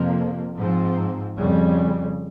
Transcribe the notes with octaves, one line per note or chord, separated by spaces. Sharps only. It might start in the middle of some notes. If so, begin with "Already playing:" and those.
Already playing: F2 C3 F3 A#3
G#2 F3 C4
F2 C#3 G3